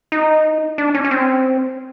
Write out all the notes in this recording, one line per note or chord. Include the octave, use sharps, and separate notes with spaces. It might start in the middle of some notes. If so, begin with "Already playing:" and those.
D#4
D4
C#4
C#4
C4